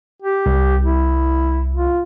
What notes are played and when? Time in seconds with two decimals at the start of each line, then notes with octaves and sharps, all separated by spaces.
0.23 G4
0.46 C2
0.83 E4
1.75 F4